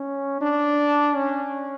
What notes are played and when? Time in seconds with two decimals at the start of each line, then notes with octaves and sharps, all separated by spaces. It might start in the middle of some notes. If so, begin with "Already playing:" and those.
Already playing: C#4
0.41 D4
1.16 C#4